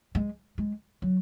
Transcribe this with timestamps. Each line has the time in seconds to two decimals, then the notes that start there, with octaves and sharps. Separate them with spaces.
0.15 G#3
0.58 G#3
1.02 F#3